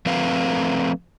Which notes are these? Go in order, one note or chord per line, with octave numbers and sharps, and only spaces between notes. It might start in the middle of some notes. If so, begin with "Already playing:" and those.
F3 A3 C4 B4 F5